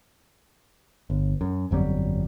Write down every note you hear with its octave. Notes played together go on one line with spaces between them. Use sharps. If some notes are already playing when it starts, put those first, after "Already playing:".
G1
F#2
G1 F2 F#3 G3